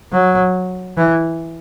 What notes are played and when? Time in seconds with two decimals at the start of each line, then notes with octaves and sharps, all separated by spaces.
0.12 F#3
0.97 E3